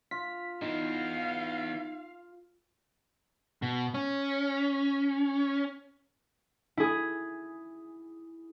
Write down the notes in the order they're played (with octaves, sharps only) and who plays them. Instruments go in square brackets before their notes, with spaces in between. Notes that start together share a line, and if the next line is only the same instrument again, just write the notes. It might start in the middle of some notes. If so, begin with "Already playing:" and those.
[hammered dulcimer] F4 [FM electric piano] B6
[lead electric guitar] E3 B3 [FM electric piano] D#4 [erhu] F5
[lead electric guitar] B2
C#4
[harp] E4 G#4